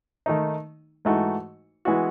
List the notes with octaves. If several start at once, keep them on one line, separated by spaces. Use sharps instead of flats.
D#3 A3 D#4
G#2 E3 A3 D#4 F#4
E3 G#3 B3 F#4